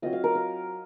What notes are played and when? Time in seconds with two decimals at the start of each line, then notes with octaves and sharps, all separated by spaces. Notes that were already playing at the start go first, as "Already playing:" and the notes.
0.02 F#3 C4 F4 D#5
0.13 F5
0.24 A#4
0.35 A#4